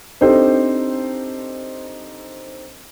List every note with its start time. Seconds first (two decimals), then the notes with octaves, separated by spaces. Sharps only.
0.21 C4 D4 D#4 G4 A4 C5